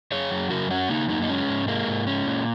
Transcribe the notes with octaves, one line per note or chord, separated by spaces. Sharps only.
F#2 G#4 C#5
F#3
C#3 F#4 A#4
F#2 C#4 F#4
C#3 A#3 D#4
F#2 A#3 D#4
D#4
G#3 C#4
G#2
G#3 A#3
G#2
G#3 C#4
A#2